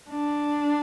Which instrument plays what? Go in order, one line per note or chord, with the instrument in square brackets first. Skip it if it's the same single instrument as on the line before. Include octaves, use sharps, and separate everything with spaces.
[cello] D4